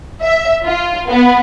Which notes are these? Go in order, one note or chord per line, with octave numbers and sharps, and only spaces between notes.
E5
F4
B3